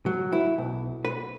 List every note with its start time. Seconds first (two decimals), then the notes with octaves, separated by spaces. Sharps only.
0.06 F#3
0.32 E4
0.58 B1
1.05 B4